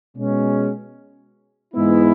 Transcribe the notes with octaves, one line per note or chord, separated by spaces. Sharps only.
B2 G#3 C#4
G#2 E3 G#3 B3 E4